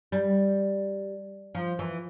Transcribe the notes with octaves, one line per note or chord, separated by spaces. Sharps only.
G3
F3
E3